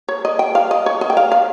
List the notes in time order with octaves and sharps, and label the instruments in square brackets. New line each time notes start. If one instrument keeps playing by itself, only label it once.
[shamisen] C#5
D#5
G5
F5
D#5
C#5
D#5
G5
F5
F5